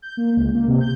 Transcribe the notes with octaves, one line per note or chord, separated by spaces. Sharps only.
G6
A#3
C#2
A#3
C3
G6